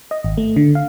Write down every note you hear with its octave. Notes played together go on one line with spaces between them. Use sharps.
D#5
G#1
A3
D3
F5